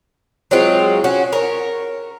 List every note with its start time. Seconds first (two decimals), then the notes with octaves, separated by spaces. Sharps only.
0.51 F#3 G#3 C4 F4
1.04 C#4 F#4
1.33 A#4 C#5